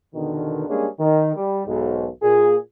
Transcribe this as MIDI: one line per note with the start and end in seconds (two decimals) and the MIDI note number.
0.14 0.67 40
0.14 0.67 47
0.14 0.67 50
0.14 0.67 51
0.68 0.87 55
0.68 0.87 56
0.68 0.87 58
0.68 0.87 61
0.68 0.87 62
0.68 0.87 68
0.99 1.33 51
1.35 1.61 55
1.66 2.07 35
1.66 2.07 44
2.22 2.56 46
2.22 2.56 68